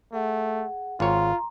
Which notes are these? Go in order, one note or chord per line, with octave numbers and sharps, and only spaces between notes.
A3 G#4 F#5
G#1 F4 C#5 A#5 C6